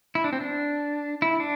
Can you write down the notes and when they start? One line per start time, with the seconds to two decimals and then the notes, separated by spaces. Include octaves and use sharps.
0.15 E4
0.24 D4
0.33 C4
0.40 D4
1.22 E4
1.40 D4